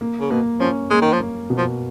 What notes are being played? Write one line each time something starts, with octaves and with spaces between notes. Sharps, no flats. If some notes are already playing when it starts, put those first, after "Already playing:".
A#3
C#3
B2 A#3
F3 C#4
G#3 A#3
D#3
F3
A#3
B2
F3